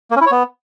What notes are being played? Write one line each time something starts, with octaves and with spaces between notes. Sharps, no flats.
A#3
C#4
E4
C#5
B3